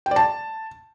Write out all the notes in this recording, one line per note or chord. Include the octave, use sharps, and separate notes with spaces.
G5
D5
A5